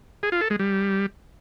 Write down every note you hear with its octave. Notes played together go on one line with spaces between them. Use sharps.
G#4
F4
A4
G#3
G3